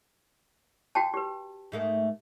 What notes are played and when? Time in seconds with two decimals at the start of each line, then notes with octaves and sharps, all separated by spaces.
0.95 F#4 G5 A5
1.14 G4 B4
1.72 G#2 A3 A#3